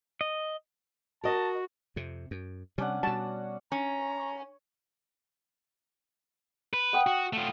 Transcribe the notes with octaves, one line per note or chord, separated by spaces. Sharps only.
D#5
F#4 A#4 D#5 A5
F2 C3
F#2
C3 G3 C#4 D4 F#5
B2 G3 F#4 A5
C#4 A#5
B4
F#5 G5 D#6
F#4
A3 F4